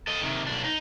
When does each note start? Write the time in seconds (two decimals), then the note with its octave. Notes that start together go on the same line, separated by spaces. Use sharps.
0.07 A4 D#5
0.22 C3 D#3
0.47 B1 D4
0.64 D#4